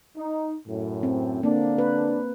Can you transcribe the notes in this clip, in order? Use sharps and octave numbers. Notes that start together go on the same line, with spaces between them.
D#4
F#2 A2
C4
D3 A#3 C4 D4
B4